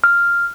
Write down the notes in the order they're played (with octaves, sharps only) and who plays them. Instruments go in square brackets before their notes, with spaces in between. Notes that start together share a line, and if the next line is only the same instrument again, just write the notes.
[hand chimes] F6